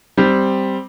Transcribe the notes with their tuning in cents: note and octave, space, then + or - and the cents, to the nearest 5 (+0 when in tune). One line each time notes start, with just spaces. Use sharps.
G3 +0 C4 +0